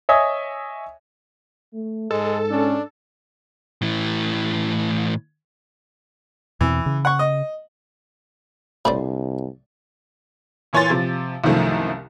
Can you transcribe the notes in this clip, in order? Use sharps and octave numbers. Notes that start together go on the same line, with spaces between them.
C#5 D#5 E5 G#5 D#6
A3
G#2 G#3 A4
C#4 D4
A2 E3
E2 B2 E3 C4
C#3
F#5 C#6
D#5
C2 A2 D3 C5 D5 B5
A#2 E3 C#5 G#5 C6 A6
C3 F3
C2 F#2 D#3 F3 A3